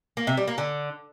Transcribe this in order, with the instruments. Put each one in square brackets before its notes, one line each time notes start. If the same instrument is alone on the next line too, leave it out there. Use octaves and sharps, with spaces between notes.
[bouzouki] A#3
C3
G3
A#3
D3